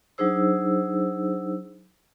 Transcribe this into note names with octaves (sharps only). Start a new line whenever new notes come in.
F#3 D4 D#4 G#4 C5 E6